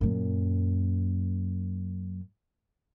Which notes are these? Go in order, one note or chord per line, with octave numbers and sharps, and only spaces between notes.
F#2 A#2